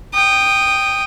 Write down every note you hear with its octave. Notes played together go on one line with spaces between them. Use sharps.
G5 D#6